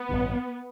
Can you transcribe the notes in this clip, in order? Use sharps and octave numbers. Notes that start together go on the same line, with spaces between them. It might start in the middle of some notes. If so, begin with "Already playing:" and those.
Already playing: B3
A1 G2 D3